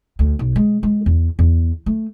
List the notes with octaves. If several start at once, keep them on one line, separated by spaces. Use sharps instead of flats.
D2
B1
G#3
G#3
E2
E2
A3